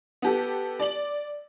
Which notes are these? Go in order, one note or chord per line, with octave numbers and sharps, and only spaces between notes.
B3 G4 A4
D5 F#7